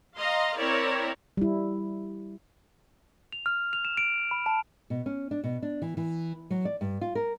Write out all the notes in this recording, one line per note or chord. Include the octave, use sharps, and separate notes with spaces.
D#5 F5 A#5 C6
C4 E4 A#4 C#5 D5
G3 E4
F7
F6
F7
E7
D7
B5
A5
B2
C#4
D4
B2
D4
E3
E3
F#3
D5
G2
F4
A#4